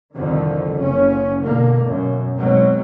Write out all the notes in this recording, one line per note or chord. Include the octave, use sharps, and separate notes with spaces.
C2 F2 D3 D#3
F#1 C#3 C#4
B2 D3 A#3
F#2 B2
B1 G#2 B2 F#3 C4